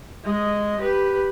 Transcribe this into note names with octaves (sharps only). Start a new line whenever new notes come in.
G#3 D#5
G4 B4